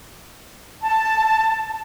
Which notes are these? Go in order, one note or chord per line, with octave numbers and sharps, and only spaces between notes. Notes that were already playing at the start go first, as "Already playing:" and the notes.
A5